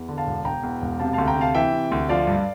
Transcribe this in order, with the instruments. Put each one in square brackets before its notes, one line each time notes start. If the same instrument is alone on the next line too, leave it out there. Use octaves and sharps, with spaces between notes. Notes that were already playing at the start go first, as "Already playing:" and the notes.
Already playing: [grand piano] E2
D3
F5 A5
E1
E1 G5 A#5
E2
E1
C3 F5 A5
D2 F5 A5
G5 A#5
C3 F5 A5
E3 E5 G5
C3
D2
F3 D5 F5
G2